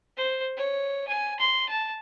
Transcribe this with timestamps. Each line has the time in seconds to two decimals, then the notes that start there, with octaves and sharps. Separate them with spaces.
0.17 C5
0.57 C#5
1.08 G#5
1.39 C6
1.69 A5